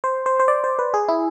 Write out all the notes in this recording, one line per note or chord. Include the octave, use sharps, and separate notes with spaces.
C5
C5
C5
D5
C5
B4
G#4
E4